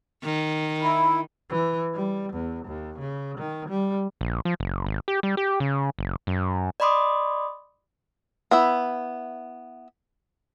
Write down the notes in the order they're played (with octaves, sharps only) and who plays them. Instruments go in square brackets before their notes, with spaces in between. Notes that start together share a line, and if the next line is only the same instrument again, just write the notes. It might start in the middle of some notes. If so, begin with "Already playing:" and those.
[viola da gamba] D#3
[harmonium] E4
[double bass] E3
G3
E2
D#2
C#3
D#3
G3
[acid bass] A#1
F3
F#1
G#1
G4
G3
G4
C#3
F#1
F#2
[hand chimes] D5 D#5 B5 C6 D6 D#6
[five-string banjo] B3 E4 E5